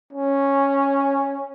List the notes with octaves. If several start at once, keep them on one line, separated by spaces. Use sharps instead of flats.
C#4